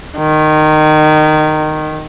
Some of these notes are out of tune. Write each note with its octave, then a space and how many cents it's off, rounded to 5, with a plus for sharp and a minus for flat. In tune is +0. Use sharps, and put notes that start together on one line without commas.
D#3 -15